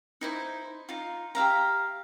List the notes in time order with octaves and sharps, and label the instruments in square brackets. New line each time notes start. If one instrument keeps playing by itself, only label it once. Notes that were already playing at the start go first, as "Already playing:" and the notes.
[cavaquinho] D#4 E4 C5
D#4 F4
G4 E5 F5 A#5